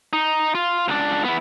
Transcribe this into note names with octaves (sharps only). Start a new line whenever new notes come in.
D#4
F4
C#2 D4
B3 E4